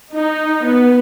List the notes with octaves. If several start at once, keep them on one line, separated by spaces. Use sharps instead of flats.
D#4
B3